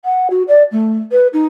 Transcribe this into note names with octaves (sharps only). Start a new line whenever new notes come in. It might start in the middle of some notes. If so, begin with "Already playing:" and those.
F#5
F#4
D5
A3
B4
D#4